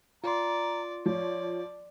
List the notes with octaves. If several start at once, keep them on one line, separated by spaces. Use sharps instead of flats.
F4 D5 A#5 C6
F3 C#5 D5